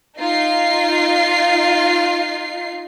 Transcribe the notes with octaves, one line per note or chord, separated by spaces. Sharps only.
D#4 F4 C7